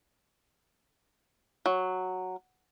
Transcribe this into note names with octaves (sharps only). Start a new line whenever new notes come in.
F#3